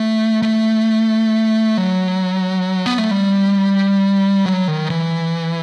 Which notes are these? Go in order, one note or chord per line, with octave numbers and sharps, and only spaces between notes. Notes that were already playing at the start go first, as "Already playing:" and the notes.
Already playing: A3
A3
F#3
B3
A3
G3
F#3
D#3
E3